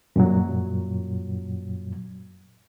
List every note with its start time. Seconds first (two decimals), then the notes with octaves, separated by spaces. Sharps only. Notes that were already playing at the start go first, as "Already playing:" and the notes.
0.16 F#2 A#2 F#3